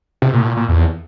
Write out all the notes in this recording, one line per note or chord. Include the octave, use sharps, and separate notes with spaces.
C3
A#2
A2
A#2
A#2
E2